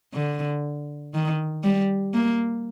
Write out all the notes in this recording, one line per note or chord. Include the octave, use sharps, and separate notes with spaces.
D3
D#3
G3
A#3